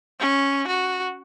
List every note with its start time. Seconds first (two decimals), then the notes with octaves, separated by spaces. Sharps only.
0.20 C#4
0.68 F#4